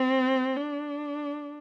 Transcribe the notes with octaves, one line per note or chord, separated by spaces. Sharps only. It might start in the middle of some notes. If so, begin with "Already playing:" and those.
Already playing: C4
D4